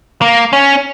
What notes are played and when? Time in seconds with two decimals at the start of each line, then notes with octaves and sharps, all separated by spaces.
0.21 A#3
0.53 C#4